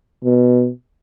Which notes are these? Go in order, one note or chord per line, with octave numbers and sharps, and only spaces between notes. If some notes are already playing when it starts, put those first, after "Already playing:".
B2